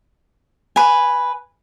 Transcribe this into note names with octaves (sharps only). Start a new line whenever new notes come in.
B4 G#5